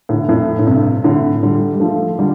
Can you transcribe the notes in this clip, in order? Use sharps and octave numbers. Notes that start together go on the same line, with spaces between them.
A2 D3
F2 A2
A2
G2 C3
A2 D3
D3 G3
G3
F3 A3
D3 G3